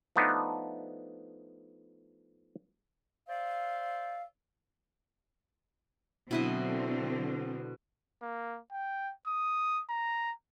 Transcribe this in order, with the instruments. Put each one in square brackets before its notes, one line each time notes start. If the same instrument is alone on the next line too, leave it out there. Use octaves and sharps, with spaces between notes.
[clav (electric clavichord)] F3 A3 B3 D4 D#4
[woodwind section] C5 D5 E5 F5
[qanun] B2 E4 D#5 [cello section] D3 F#3 C4
[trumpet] A#3
G5
D#6
A#5